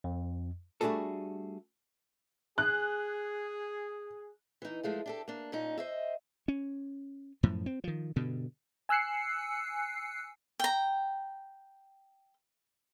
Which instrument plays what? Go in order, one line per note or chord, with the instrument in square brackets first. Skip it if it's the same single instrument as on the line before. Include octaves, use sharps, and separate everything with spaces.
[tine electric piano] F2
[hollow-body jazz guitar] G3 A3 D4 F#4 G#4 A4
[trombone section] G#4 [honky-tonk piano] F#6
[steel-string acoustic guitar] E3 D#4
F3 G#3 A3 F4
D4 G4 A4
A#3 D4
A#2 C#4 D#4
C5 D#5 E5
[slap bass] C#4
F#2 A2 F3
C4
D#3 F3
G2 B2 D3
[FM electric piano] G#5 E6 F#6 C7 C#7
[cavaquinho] G5 A#5